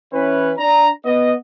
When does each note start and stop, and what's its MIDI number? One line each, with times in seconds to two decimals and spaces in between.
0.13 0.52 52
0.13 0.52 61
0.13 0.52 71
0.58 0.89 62
0.58 0.89 82
1.05 1.33 59
1.05 1.33 75